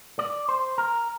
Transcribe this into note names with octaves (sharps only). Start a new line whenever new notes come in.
D5
C5
A#4